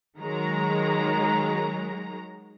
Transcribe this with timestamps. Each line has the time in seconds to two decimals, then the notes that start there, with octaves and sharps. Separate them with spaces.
0.19 D#3 F#3 G#3 A#5